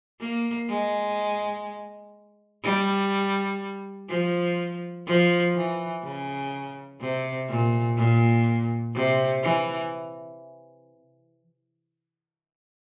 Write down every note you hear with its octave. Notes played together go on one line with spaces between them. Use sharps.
A#3
G#3
G3
F3
F3
E3
C#3
C3
A#2
A#2
C3
E3